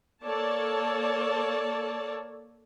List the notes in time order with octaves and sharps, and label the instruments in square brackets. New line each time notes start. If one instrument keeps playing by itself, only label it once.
[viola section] A#3 A4 C#5 D5 A5